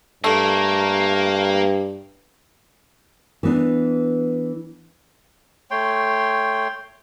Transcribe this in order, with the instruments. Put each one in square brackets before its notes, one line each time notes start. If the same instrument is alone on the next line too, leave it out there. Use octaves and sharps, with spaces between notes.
[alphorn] G2 [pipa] A3 [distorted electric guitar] A#3 A#4
[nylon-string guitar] E3 B3 D4
[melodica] A3 C#5 G5 C6